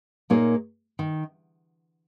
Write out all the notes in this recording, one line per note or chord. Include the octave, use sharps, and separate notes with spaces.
A#2 A#3 D#4 G#4 C#5
D#3